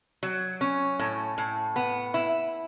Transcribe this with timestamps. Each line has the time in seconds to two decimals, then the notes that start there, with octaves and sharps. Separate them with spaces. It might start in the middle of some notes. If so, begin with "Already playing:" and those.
0.23 F#3
0.61 C#4
0.99 A2
1.38 A2
1.76 B3
2.14 E4